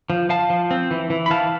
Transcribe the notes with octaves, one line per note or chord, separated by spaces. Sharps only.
F3
F3 F5 A5
F3
C4
E3
E3
B5
E3 F5 A5